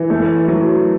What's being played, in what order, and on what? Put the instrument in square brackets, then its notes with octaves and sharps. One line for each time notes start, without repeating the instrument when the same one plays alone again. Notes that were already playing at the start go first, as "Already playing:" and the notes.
Already playing: [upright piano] E3
A3
F#3